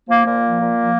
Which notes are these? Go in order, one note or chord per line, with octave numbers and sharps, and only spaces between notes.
F3 A#3
A#2 A#3
F3
A#2
F3